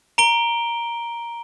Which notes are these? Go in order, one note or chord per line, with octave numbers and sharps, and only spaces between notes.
A#5 D7 G7